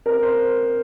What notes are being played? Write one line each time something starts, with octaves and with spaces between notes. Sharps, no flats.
C4 A#4
C5